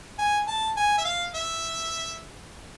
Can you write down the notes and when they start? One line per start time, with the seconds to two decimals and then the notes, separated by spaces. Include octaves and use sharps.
0.18 G#5
0.47 A5
0.77 G#5
0.98 E5
1.05 F5
1.34 E5